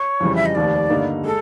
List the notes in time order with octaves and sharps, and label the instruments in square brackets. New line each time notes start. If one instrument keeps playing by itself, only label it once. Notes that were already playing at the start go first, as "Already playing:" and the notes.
Already playing: [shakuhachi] C#5
[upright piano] F2 C#3 E3 G3
[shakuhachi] E5
D#5
[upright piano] F1 D#2 D#3 [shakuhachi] D5
[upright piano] G2 D3 G3 A#3 D#4
[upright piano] G#3 [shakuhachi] A4